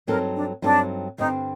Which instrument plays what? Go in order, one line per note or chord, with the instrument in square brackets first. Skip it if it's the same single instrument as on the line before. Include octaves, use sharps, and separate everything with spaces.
[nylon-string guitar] G2 F#3 C4 D#4 A4 [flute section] A#4
[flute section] D4
[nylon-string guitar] G2 F#3 C4 D#4 A4 [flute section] D4
[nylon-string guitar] G2 D3 G3 C4 [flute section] D#4